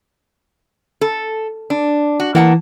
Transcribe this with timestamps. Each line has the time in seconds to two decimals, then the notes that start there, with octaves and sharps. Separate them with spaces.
1.01 A4
1.70 D4
2.20 F#4
2.35 E3 A#3 F#5 A5